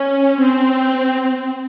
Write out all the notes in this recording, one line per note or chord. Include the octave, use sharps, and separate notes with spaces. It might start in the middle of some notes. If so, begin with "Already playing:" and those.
Already playing: C#4
C4